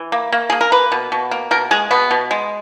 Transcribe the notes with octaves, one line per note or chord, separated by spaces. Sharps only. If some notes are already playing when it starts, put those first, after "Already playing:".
Already playing: E3
A#3
A#3
A#3 G#4
A#4
A#3 B4
B2
B2
A#3
B2 A#4
G#3 G#4
B2 B3
B2
G#3